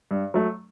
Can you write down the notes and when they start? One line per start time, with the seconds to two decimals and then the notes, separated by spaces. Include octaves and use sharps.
0.11 G2
0.34 F#3 A3